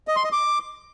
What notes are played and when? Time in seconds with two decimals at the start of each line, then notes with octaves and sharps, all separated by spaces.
0.08 D#5
0.16 C6
0.24 D#5
0.32 D6